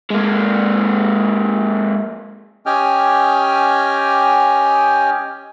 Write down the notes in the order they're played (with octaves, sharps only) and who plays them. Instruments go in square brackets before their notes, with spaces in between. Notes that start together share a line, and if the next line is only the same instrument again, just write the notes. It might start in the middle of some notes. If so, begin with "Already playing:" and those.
[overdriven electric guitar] G#3 A#3
[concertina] C#4 G4 D#5 G5 G#5 F6